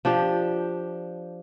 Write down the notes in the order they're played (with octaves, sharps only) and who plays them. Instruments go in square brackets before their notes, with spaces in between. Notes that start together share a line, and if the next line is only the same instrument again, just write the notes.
[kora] F3 D4 G4